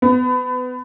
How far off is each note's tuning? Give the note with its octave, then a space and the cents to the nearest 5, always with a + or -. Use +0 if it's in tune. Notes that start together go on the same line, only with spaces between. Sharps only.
B3 +25